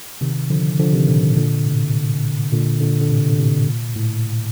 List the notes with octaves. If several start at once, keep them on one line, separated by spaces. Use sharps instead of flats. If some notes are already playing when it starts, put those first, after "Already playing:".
C3 D#3
D3 F3
D3 F3
C3 D#3
A#2 D3
A2 C3
A#2 D3
A2 C3
A#2 D3
A#2 D3
D3
A2 C3
D3
A2 C3
A#2
A2